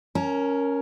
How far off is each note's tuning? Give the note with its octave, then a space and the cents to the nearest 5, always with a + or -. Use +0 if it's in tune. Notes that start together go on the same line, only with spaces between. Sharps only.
C#4 +0 A#4 +0 A5 -40